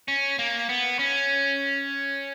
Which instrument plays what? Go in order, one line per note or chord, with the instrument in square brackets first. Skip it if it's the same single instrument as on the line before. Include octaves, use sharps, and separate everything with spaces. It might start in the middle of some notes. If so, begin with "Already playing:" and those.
[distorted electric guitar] C#4
A#3
B3
C#4